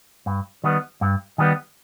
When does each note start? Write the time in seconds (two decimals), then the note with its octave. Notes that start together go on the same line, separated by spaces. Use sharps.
0.26 G2
0.64 D#3 G3 B3
1.01 G2
1.38 D#3 G3 B3